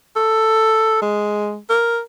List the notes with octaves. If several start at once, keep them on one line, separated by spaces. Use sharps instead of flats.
A4
G#3
A#4